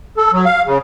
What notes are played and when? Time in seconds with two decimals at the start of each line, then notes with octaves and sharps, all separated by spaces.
0.17 A4
0.33 F#3
0.45 F5
0.66 C#3